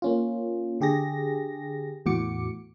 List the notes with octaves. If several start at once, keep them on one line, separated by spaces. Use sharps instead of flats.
A#3 C#4 F4
D3 G4 G#4 A#6
E2 A2 F#4 D6 C#7